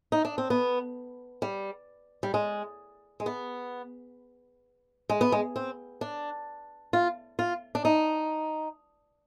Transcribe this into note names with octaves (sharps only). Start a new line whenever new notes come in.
D#4
D4
C4
B3
G3
G3
G#3
G#3
B3
G#3
B3
G#3
C4
D4
F4
F4
D4
D#4